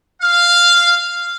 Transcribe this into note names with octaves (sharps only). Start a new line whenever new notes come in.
F5